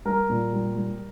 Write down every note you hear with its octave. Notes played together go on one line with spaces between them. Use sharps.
G3 A#4
A#2
G3
G3